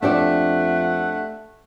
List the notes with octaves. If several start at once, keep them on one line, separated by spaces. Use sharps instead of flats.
F2 A3 D4 G4 D5 F#5